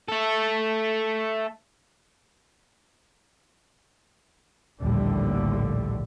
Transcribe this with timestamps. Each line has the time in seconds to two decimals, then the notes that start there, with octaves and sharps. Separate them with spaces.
0.08 A3 A4
4.81 A#1 D#2 A2 D3 G3